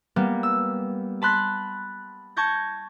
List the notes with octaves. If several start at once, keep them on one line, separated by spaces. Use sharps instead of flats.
G3 A#3 B3
E6
A5 B5 C6 F#6 A6 B6
A5 C#6 G6 G#6 A#6